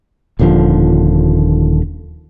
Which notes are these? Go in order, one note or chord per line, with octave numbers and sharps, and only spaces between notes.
D#1 D#2 D3 F3